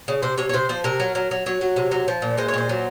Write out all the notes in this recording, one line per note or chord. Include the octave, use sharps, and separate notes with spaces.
C#3
C3 C5
C3 C#5
C#5
C3 C5
F3 C5
C3 A#4
F#3
F#3
F#3
F#3 C#5
F#3
C3
F#3
F3
A#2
G#3 C5
C#5
A#2 C5
F#3